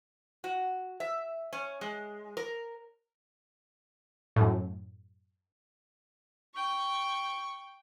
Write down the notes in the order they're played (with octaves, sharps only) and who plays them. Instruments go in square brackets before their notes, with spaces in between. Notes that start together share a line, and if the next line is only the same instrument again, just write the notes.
[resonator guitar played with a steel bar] F#4
E5
C#4
G#3
A#4
[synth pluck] F#2 A2
[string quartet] G5 [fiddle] C#6